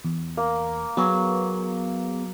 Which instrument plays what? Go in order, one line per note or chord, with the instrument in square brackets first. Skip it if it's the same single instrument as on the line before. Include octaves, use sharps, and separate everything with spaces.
[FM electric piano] E2
[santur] A#3
[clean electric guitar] F#3 [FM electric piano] B3 G#4